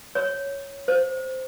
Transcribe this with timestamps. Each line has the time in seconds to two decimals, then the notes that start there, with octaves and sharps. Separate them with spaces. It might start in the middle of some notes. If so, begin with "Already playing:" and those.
0.15 C#5
0.88 C5